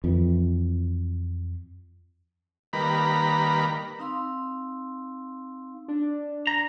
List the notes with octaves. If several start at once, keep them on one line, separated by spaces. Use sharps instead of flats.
F2 E3
D#3 G3 A#3 B4 A#5 B5
C4 D#4 F5 C6 E6
D4
A#5